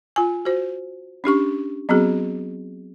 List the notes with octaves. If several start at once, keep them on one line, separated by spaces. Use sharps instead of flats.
F4 G#5
F#4 C5
C#4 D4 G4 C#6
F#3 B3 C4 F#4 G#4